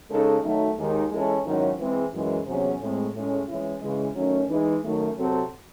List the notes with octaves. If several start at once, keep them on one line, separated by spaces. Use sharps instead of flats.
C#3 G#3 D#4 A4
D#3 F#3 A3
D#2 D#3 G#3
E3 G#3 C#4 E4 A4
G#2 D#3 F#3 C#4 E4
E3 G#3 C4
F#2 E3 G#3
E2 C3 F#3 C#4 G#4
A2 G#3 C4
A2 G#3 C#4
E3 G#3 C#4 E4
C#3 E3 G#3
D#3 F#3 A3 C#4
E3 G#3 D#4
F#2 D#3 A3
C3 F#3 C4 F#4 A4